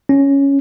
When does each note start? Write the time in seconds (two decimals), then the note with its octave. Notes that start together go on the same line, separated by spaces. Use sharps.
0.09 C#4